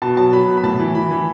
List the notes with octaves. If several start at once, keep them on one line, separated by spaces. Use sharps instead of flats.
B2 A5
F#3 A5
F#3 B5
B2
B5
A2 A5
E3
E3 B5
E3